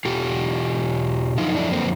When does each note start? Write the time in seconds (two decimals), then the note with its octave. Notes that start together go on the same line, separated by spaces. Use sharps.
0.05 E2 B2 F4 G4
1.38 F#2 D3 F3 D#4 F4
1.54 D4 E4
1.71 A#3 C4